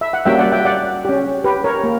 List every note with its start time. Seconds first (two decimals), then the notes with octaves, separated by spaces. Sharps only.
0.01 E5
0.13 F#5
0.26 G3 A#3 C#4 F#4 E5 G5
0.38 D5 F#5
0.52 E5 G5
0.65 D5 F#5
1.05 C#4 G4
1.44 G4 B4
1.64 A#4 C#5
1.84 A#3